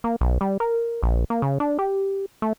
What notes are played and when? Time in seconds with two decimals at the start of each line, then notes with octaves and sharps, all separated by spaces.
0.04 A#3
0.21 B1
0.41 G3
0.60 A#4
1.03 A#1
1.30 A#3
1.42 C#3
1.60 D4
1.79 G4
2.42 A3